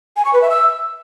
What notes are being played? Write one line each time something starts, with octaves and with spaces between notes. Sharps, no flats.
G#5
C#6
B4
E5
E6